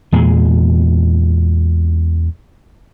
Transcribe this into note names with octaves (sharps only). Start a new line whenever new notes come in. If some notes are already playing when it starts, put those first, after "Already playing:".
E2 A#2 G#3